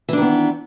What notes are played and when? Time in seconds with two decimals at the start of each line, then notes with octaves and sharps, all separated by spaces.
0.09 E3
0.13 D4
0.17 D#3
0.22 B3